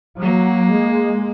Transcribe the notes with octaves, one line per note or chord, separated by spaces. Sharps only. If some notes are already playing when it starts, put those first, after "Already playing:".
F#3 A#3
G#3